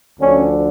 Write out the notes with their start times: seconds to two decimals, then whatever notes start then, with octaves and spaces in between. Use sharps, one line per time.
0.19 D2 D3 F3 C#4